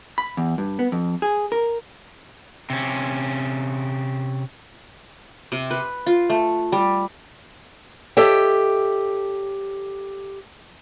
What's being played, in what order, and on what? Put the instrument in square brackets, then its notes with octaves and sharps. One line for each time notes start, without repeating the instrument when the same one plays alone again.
[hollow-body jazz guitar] B5
E2
G2
B3
F2
G#4
A#4
[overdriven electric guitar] C3 C#4
[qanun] C3
B4
F4
A3
G3
[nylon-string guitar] G4 A4 C#5 D#5 E5 G5